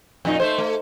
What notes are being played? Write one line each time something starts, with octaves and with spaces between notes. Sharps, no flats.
F2 A#2 D#4
A3 C5
A3